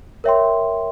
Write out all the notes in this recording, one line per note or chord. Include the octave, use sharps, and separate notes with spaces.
A#4 C#5 E5 G5 C6